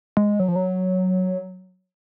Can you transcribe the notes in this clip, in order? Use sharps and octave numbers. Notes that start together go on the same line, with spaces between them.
G#3
F#3
F3
F#3